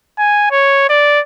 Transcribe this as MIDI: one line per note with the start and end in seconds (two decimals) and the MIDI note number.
0.18 0.46 80
0.51 0.88 73
0.89 1.20 74